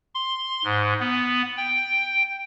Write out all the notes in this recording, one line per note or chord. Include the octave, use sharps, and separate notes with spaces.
C6
G#2
B3
G5